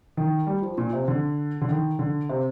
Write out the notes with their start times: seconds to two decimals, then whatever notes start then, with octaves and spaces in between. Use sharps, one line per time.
0.17 D#3
0.47 G3
0.62 F3
0.78 A#2
0.93 C3
1.08 D3
1.61 D3
1.68 D#3
1.99 D3
2.29 C3